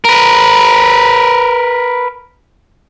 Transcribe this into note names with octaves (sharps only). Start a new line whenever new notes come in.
A#4 B4